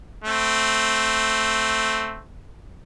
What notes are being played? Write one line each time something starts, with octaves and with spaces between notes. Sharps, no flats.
A3 C4